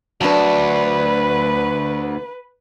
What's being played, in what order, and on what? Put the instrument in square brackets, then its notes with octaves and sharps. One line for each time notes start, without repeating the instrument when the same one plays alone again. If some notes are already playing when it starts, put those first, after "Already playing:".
[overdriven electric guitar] D2 [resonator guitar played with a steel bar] F#3 D4 [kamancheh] B4